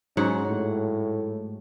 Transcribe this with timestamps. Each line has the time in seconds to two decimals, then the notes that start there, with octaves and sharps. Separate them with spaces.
0.17 G#2 F#3 C#4 F#5
0.48 A2